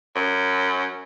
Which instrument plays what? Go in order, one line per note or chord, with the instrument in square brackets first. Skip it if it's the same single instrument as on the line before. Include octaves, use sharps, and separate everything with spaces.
[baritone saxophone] F#2